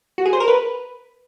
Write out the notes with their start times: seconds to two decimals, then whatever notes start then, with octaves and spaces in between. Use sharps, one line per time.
0.18 F#4
0.25 G#4
0.33 C5
0.40 A#4
0.48 B4